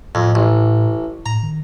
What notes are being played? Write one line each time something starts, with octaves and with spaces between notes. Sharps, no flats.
F2 A2
A1
A2 A#5
D#3